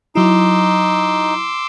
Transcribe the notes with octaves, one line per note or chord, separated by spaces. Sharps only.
F#3 D#4 E4 C6 D6 E6